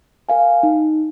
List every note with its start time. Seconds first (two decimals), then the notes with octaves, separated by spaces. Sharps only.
0.29 A#4 F5 G#5
0.63 D#4